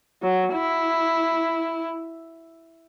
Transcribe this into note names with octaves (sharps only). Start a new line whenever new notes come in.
F#3
E4